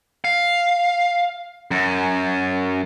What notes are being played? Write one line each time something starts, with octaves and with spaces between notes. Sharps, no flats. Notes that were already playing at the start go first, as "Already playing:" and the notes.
F5
F#2